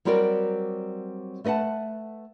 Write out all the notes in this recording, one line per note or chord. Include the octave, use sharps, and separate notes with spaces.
F#3 G3 C4 F#4 A#4 D5
A3 B4 D#5 F#5 A5